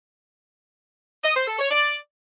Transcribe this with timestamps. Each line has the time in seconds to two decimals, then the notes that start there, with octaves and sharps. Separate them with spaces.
1.24 D#5
1.36 C5
1.47 A4
1.59 C#5
1.71 D5